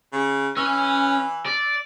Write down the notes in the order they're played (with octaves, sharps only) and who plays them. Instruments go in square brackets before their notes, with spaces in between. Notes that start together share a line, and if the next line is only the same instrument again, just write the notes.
[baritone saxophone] C#3
[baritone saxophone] E3 [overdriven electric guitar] C#4 [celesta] E6
[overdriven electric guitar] D5